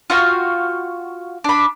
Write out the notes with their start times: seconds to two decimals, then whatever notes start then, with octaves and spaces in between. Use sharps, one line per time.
0.10 F4 F#4 F5 G5
1.44 D4 B5